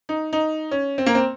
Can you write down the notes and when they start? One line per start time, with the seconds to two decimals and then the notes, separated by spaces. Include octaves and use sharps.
0.09 D#4
0.33 D#4
0.71 C#4
0.98 C4
1.06 A#3
1.15 C4